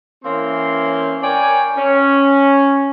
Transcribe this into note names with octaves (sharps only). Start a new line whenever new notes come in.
E3 A#3 C4 C#4 G#5 C6
A#4 C#5 D5 G5 G#5
C#4